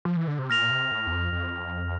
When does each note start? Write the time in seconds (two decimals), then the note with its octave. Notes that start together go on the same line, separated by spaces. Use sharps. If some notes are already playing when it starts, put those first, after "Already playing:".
0.05 F3
0.16 E3
0.28 D3
0.39 C3
0.50 A#2 F6 A#6 F7
0.71 C3
0.92 A2
1.07 E2
1.12 F2
1.33 F2